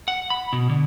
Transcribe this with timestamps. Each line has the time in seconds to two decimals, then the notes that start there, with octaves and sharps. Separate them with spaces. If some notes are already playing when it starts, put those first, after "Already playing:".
0.08 F#5
0.30 B5
0.53 B2
0.69 D3